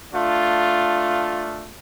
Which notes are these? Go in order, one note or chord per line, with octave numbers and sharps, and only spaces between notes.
A3 D4 F4